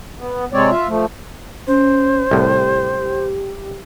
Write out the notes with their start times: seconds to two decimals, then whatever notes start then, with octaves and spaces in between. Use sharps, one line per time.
0.18 B3
0.53 C3 G#3 C4 C#5 D5
0.71 F4 E5
0.88 F3 A3
1.67 C#4 C5
2.31 C2 A2 G4